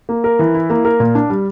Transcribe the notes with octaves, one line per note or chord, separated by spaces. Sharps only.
A#3
A#4
E3
E4
A#3
A#4
A#2
D4
G3